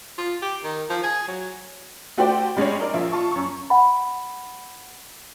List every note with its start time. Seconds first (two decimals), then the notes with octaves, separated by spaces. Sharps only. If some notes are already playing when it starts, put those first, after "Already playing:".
0.18 F4
0.42 G4
0.64 D#3
0.90 F3
1.03 G#4
1.28 F#3
2.17 A3 F#4 G4 C5 D5 G5
2.57 G3 G#3 C#4 D4 C#5
2.80 D#4 A#4 D5
2.93 A#1 F3 F4 E5
3.12 F4 A5 C#6
3.31 F#2 C#6
3.70 F#5 B5